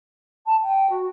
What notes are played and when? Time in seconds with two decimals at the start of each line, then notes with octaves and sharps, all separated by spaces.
0.46 A5
0.62 G5
0.90 F#4